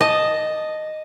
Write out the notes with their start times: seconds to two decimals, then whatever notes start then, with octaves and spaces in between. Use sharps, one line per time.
0.01 D#5 A5